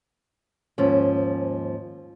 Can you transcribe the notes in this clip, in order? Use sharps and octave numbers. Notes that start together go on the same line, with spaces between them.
D#2 G#2 F3 C#4